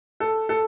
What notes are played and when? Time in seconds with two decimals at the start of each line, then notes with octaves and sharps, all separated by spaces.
0.20 A4
0.49 A4